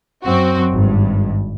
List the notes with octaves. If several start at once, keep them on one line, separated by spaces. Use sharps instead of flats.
F#2 C4 F#4
G#1 G2